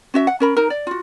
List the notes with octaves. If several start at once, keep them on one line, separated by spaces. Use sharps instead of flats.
C#4 F#4 E5
F#5
C#4 A#4 B5
D#4 A#4
D5
F4 F#4